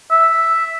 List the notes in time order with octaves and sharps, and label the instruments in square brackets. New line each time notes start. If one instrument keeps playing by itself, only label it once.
[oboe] E5